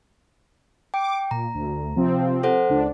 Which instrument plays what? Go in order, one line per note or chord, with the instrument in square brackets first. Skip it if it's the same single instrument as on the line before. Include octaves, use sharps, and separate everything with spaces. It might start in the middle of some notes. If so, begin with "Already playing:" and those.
[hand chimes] G5 [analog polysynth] D6
[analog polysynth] A#2 [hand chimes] A#5
[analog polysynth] D2
C3 F3 C4
[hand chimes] A4 C5 F#5
[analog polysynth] C#2 D4